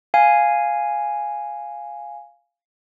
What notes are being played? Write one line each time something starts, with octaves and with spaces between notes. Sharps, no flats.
F5 G#5